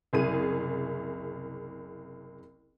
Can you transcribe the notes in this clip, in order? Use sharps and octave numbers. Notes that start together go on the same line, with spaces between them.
F#1 C2 G#4 D#7